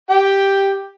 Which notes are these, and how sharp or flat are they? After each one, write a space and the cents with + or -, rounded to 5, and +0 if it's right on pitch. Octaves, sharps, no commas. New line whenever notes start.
G4 +0 G5 +5